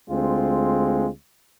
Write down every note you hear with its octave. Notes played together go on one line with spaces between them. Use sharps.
D2 G#3 C4 F4